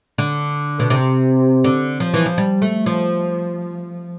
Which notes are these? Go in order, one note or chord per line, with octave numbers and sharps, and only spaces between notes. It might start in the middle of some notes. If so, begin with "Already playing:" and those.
D3
B2
C3
D3
F3
E3
F3
G3
A3
F3